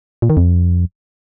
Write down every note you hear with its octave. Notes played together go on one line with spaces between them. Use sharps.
A#2
D#3
F2